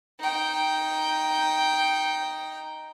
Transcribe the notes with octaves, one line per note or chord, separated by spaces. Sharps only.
D#4 G5